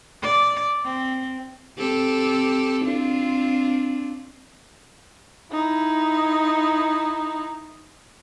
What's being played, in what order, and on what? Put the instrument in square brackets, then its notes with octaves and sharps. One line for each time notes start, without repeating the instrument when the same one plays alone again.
[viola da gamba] D5
C4
C4 G4 A4
C4 D4 F4
[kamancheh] D#4 E4